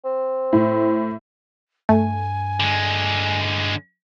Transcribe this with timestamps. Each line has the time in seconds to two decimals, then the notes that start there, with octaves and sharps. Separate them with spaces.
0.05 C4
0.53 A2
1.89 G2 A3 G#5
2.60 D3 G#3